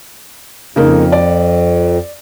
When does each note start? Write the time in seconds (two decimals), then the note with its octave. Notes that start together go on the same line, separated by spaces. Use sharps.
0.76 F2 C#3 A#3 D#4
1.12 D5